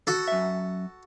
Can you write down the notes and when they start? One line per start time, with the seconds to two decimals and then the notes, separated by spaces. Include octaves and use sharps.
0.07 F#4 A4
0.28 F#2 E5